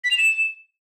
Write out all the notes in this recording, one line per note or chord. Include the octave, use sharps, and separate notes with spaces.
B6
F7
E7